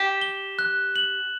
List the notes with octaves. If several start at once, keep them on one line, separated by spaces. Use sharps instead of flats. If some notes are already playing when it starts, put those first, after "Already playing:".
Already playing: G4 E7
G7
F#6
F#7